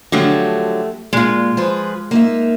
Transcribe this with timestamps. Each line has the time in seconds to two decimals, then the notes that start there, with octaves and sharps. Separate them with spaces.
0.12 D3 F3 F#3 A3 G4
1.13 A#2 G#3 F4
1.57 F3 G#4 B4
2.11 A#3 D#4 E5